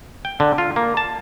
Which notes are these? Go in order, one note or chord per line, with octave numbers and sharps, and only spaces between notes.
G5
D3
F4
A#3
A5